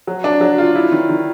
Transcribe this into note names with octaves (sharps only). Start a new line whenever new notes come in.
F#3
D4
F#3
F4
E4
D#3
D#3